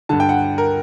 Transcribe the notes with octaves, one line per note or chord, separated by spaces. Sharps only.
G2 D3 A5
G5
F#5
A#4